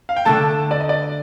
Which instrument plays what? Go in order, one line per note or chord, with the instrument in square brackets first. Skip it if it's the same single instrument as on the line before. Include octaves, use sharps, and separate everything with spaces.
[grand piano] F5
G5
[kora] D3 A3 D4 A4 [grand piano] A5
[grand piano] D5
D#5
D5